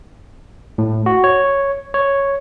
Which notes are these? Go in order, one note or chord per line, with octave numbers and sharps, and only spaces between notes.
A2
F#4
C#5
C#5